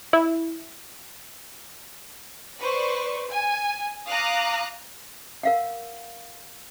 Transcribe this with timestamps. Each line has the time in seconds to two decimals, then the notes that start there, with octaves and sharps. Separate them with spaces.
0.13 E4
2.58 B4 C5 D5 C#6
3.29 G#5
4.07 F5 A#5 D6 D#6 F#6
5.43 A#4 F5 F#5